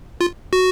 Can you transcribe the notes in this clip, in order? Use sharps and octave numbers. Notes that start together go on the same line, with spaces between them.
F4
F#4